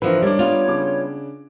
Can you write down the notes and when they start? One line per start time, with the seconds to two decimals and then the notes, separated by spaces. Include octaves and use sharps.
0.02 D3 E3 F3 A#4 B4
0.22 G3 D4 A#4 C#5 D5
0.39 G3 B3 F4
0.68 C#3 D4 D6